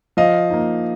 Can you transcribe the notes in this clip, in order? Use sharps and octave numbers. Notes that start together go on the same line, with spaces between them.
F3 D#5 F5
A#3 D#4